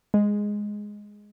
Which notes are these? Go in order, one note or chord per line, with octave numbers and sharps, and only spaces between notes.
G#3